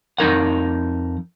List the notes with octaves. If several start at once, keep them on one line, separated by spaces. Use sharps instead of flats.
F2 D#4 A#4 F#5